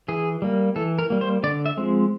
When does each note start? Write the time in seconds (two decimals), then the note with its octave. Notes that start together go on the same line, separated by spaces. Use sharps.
0.08 E3 G#4
0.42 G3 A#3
0.76 E3 A4
0.99 A#4
1.10 G3 A#3
1.21 C5
1.43 D3 D5
1.66 E5
1.77 F3 G#3 C4